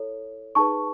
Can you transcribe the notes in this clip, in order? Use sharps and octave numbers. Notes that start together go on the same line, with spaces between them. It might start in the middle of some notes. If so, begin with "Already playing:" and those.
Already playing: E4 A4 C#5
D#4 G#4 B4 A5 C#6